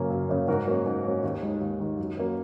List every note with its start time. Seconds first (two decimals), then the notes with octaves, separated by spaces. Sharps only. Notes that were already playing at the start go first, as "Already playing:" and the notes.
Already playing: F#2 C#3 A#3 C#4
0.10 F#2
0.29 C#3 A#3 C#4
0.48 G#2 F#4 A#4
0.67 F#3 A#3 C#4
0.86 G#2
1.04 F#3 A#3 C#4
1.23 D#2
1.42 D#3 G#3
1.61 D#2
1.80 D#3 G#3
1.98 F#2
2.17 F#3 A#3 C#4